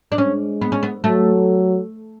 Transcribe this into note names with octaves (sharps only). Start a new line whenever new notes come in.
D4
G#3 C#4
B3
C#4
B3
F#3 A3